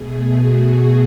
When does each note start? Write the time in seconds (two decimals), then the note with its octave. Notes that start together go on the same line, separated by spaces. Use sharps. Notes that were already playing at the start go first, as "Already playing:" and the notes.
Already playing: B2 A3 G#4
0.33 F#4